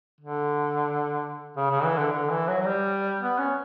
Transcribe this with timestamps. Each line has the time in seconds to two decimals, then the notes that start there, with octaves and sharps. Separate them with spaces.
0.20 D3
1.57 C#3
1.70 C#3
1.84 E3
1.98 D3
2.11 D3
2.29 E3
2.48 F#3
2.61 F#3
2.66 G3
3.20 B3
3.38 C#4